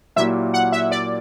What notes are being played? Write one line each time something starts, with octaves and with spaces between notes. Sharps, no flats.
A#2 F#3 A#3 E4 G4 E5
F#5
E5
D5